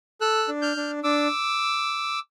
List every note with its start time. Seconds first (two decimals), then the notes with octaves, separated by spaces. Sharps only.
0.21 A4 E6 F#6
0.48 D4
0.62 F6 G6
0.77 D4
1.03 D4 D6 E6